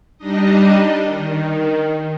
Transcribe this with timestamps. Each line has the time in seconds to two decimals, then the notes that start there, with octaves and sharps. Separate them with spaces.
0.18 G3 D4 D#4 D#5
1.04 D#3